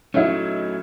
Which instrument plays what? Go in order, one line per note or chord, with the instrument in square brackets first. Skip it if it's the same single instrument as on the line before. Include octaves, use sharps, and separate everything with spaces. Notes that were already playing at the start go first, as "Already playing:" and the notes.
[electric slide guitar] F#3 A3 [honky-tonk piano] C#4 D#4 E4